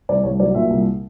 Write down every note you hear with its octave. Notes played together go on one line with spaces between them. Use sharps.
C2 D5
C2 C#5
F#3 D5
A#2 E5
C2